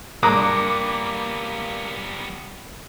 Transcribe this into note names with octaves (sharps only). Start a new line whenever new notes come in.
G2 G3 A#3 B3 A#5 D6 F#6